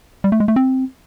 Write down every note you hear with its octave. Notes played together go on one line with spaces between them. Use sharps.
G3
A3
G#3
A3
C4